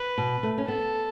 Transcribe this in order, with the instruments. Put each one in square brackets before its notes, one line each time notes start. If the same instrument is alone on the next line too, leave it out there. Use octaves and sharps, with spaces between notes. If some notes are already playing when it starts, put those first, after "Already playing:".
Already playing: [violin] B4
[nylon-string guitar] B2
A3
C#4
[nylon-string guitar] B3 [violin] A4